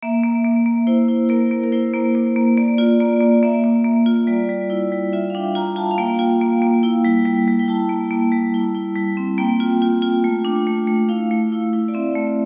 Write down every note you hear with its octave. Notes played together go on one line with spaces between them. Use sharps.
A#3 E5
A#3
A#3
A#3
E4 C5
E4
A#3 A#4
A#3
A#4
E4 C5
A#3
A#3
A#3
A#3 D5
F4
A#3 D5
A#3
A#3 E5
A#3
A#3
F4
G3 D5
G3
E4
G3
F4 E5
F5
D4 G5
F4 A#5
F4 A5
F5
A#3 G5
F4
A#3
A#3
E4
G3
G3
G3
G5
E4 A5
A#3
A#3
G3
E4
E4
G3
C4
A#3 G5
F4
F4
F4
A3
D4
A3
A3
E4 F5
A3
E4
E4
D5
C4 E5
A3